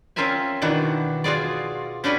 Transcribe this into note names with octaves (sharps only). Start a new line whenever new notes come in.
C4 C#4 F4 A#4 E5 G#5
B2 D#3 E3 D4 F#4
F4 F#4 G#4 D5
C#4 D4 F#4 B4 G5 G#5